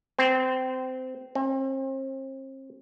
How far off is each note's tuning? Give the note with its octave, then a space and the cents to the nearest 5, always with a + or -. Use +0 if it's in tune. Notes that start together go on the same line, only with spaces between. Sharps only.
C4 -20
C4 +40